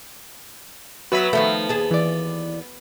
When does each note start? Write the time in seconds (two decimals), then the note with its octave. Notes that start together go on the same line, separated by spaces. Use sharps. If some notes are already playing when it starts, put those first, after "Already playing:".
1.12 F#3 B3 F#4 B4 E5 B5
1.33 D#3 F3 A3 B3
1.69 D#2 G#4 A5
1.91 E3 D5